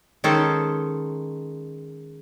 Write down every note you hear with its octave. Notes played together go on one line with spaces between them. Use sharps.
D#3 G#3 C#4 A4 C5